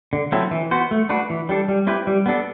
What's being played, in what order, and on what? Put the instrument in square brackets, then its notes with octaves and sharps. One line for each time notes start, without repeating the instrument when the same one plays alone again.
[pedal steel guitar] D3
F#3 C4 E4 A4
E3
B3 F#4 C5
A3
D4 F#4 B4
E3
G3 D4 A4
G3
C4 E4 G4 B4
G3
B3 D4 A4